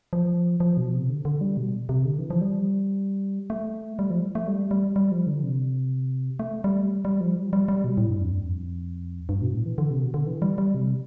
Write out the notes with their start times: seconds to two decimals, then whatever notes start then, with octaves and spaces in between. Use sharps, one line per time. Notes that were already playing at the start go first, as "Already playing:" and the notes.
0.13 F3
0.60 F3
0.77 B2
0.94 C3
1.09 D3
1.25 D3
1.41 G3
1.57 B2
1.89 C3
2.05 D3
2.18 E3
2.30 F3
2.41 G3
3.50 A3
3.99 G3
4.10 F3
4.35 A3
4.47 G3
4.71 G3
4.96 G3
5.12 F3
5.27 D3
5.43 C3
6.39 A3
6.64 G3
7.05 G3
7.21 F3
7.37 G3
7.53 G3
7.68 G3
7.84 B2
7.98 A2
8.10 G2
8.21 F2
8.32 G2
8.43 F2
9.29 G2
9.42 B2
9.53 A2
9.66 E3
9.78 D3
9.90 C3
10.02 B2
10.14 D3
10.27 E3
10.42 G3
10.58 G3
10.75 C3